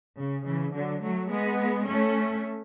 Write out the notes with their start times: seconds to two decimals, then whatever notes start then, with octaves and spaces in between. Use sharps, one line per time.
0.18 C#3
0.45 C#3 E3
0.74 D3 F#3
1.03 F#3 A3
1.30 G#3 B3
1.88 A3 C#4